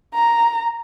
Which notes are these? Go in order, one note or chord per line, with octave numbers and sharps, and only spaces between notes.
A#5